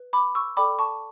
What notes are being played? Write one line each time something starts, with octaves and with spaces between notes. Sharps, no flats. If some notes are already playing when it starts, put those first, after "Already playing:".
Already playing: B4
B5 D6
C#6 E6
A4 D5 G5 B5 D6
A5 C#6